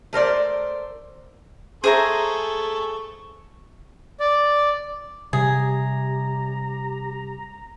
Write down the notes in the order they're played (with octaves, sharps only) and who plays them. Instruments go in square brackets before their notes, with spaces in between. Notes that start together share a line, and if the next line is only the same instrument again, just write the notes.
[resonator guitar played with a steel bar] A3 A#4 C5 D5
[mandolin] G#4 [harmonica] A4 C#6 [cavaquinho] C5 E5 A#5
[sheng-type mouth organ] D5
[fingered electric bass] C3 G3 [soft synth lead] G4 [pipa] G#4 [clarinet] A#5